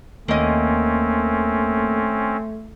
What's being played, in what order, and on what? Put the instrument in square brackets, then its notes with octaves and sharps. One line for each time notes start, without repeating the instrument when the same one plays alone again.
[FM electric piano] D#2 [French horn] A3 [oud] A#3 D#5 [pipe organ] C4 C#4